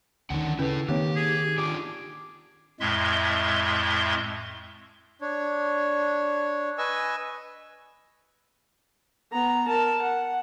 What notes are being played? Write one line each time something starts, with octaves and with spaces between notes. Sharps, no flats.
D2 D#3 C#4 D4 F#5
C#3 C#4 E4 A4 B4
D#3 A#3 C4 G4 C#5
G#4
D4 F4 G4 D6
F2 A2 G#3 E5 C6
D4 C#5
B4 D#5 G#5 C#6 E6
B3 A#5
A#4 A5
F#5